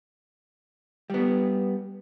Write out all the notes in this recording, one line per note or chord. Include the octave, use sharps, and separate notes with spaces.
G3 B3